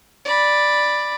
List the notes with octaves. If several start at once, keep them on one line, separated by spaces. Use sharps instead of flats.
D5 B5